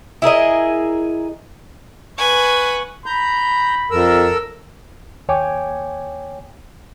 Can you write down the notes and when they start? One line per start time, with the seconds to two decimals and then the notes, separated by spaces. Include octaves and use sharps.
0.22 E4 G#4 A#4 D#5
2.18 B4 F#5 G#5 C#6
3.06 A#5 B5 G6
3.91 F2 A4 A#4 E6
5.29 D#2 C#5 G5 G#5 D6